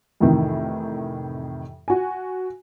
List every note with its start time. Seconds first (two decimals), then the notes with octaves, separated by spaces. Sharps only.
0.20 F2 A2 C3 D#3 E3
1.88 F#4 G#5